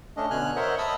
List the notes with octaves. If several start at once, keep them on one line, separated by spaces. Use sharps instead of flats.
A3 C#4 D4 D#5
B2 D3 G#5 F6 F#6
A#4 C5 C#5 D#5 E5 F#5
D#5 A5 B5 D#6 E6